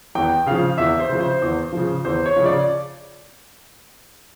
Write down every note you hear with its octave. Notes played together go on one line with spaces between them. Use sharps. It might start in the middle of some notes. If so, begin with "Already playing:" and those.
E2 G5
C#3 F3 F5
E2 E5
C5
C#3 F3
C5
E2
C#3 F3
E2 C5
C#5
C#3 F3
D5